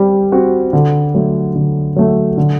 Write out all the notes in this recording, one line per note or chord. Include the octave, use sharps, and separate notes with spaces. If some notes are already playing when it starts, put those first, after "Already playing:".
Already playing: G3 C4
C4 F#4
D3
F#3 A3
D3
F#3 A3
D3